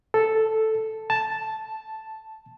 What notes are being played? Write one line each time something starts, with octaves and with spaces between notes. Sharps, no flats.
A4
A5